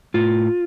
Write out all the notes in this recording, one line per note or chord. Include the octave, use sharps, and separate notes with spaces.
A2 F4